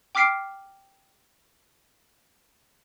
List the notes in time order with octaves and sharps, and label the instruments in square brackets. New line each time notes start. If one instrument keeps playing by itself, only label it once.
[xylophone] G5 D6 F6 B6 C7 D7